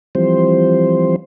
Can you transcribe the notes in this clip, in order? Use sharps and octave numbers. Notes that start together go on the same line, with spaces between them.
E3 F3 G3 C4 C5